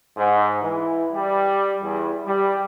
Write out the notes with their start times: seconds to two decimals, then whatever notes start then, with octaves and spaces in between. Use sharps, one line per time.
0.17 G#2
0.62 E3
1.13 G3
1.83 E2
2.26 G3